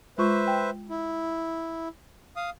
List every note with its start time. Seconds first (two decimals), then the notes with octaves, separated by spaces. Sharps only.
0.18 G#3 F4 B4 C5 E5 C#6
0.47 G5
0.90 E4
2.36 F5 D#6